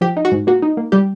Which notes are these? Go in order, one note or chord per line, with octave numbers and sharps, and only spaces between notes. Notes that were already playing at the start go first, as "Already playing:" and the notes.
F3 G4
D#4
F#4
G#2
A#3 F#4
D#4
A#3
G3 G4